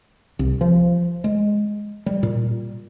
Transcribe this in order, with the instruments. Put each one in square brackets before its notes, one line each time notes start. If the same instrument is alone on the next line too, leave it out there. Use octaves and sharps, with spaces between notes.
[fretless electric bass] C2
F3
G#3
G3
A#2